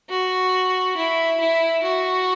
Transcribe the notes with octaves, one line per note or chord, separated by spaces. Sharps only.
F#4
E4
E4
F#4